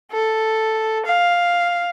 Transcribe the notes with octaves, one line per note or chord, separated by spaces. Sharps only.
A4
F5